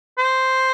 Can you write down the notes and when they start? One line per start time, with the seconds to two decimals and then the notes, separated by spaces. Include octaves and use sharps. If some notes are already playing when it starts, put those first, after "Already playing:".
0.18 C5